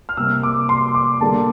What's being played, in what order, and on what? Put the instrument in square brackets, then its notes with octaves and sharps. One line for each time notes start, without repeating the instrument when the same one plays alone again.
[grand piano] F6
C3 G3 A#3 E6
D6
C6
D6
D3 G3 A#3 A5